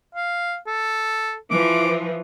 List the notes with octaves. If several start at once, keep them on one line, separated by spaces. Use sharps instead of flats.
F5
A4
E3 F3 D6